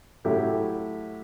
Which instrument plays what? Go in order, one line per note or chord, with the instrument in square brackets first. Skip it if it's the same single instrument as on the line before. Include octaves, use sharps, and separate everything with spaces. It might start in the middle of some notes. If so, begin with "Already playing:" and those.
[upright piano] A2 F#3 A3 E4 G4